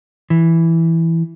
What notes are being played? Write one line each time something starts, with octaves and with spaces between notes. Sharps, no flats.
E3